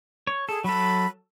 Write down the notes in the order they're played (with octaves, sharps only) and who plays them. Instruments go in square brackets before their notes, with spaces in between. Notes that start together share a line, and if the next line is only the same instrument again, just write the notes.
[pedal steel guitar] C#5
[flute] G#4 [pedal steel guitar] A4
[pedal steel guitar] F#3 A4 [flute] B5